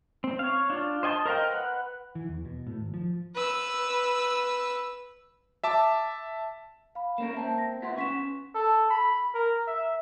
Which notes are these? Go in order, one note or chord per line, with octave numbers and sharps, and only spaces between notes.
C4
C#5 F5
D4 F4
C5 D#5 G#5 A5 C6
A#4 C5 D#5 F5 G5
B4 F#5
E3
E2
B2
A2
G#1
F3
B4 E6
E5 A5 D6
F5 B5
A#3 C#4 A#4 E7
A#3 C4 E5 A5
A#6
B3 F4 E5 F#5 C6
B3 C#4 C#6 B6 E7
A4
B5
A#4
E5